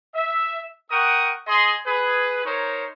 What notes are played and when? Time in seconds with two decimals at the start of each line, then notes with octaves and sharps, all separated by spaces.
0.15 E5
0.91 A#4 F#5 G5 C#6 D#6
1.47 G#4 D#5 C6
1.86 G#4 B4
2.45 D#4 A#4 C5 C#5